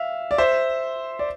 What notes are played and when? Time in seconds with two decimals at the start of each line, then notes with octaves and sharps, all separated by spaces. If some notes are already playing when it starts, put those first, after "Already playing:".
Already playing: E5 F5
0.31 D5
0.38 C5 E5
1.19 D5